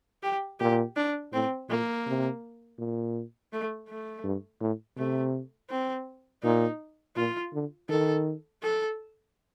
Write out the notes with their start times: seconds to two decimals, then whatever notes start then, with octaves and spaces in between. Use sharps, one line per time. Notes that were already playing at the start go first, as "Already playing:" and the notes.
0.23 G4
0.60 A#2 G4
0.96 D4
1.32 A2 C4
1.69 A#2 A#3
2.06 C3
2.78 A#2
3.52 A3
3.88 A3
4.24 G2
4.60 A2
4.97 C3 A3
5.70 C4
6.43 A#2 D#4
7.16 A#2 F4
7.53 D3
7.89 D#3 A4
8.62 A4